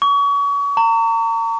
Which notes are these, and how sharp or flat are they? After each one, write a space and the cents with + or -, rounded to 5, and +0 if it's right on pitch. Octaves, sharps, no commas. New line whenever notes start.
C#6 +35
A#5 -35